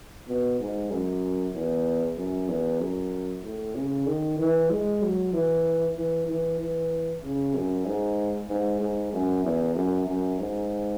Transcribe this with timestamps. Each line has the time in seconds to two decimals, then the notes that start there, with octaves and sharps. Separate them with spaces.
0.29 B2
0.60 G#2
0.91 F#2
1.54 E2
2.18 F#2
2.49 E2
2.80 F#2
3.44 A2
3.76 C#3
4.07 D#3
4.39 E3
4.70 G#3
5.02 F#3
5.33 E3
5.96 E3
6.28 E3
6.60 E3
7.23 C#3
7.55 F#2
7.86 G#2
8.49 G#2
8.80 G#2
9.13 F#2
9.44 E2
9.75 F#2
10.07 F#2
10.39 G#2